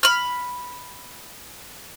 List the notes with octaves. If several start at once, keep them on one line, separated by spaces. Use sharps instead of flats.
B5 F6